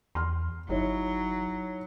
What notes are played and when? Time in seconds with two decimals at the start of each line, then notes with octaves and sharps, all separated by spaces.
0.15 E2 C6 F6
0.69 G1 F#3 D#4 E4 C#5